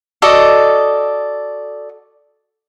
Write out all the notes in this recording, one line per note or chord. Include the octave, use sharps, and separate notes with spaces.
F#4 A4 D5 D#5